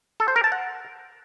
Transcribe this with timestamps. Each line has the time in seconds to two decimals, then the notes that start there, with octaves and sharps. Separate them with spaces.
0.20 A4
0.28 C5
0.36 A#4
0.44 A5
0.52 F#5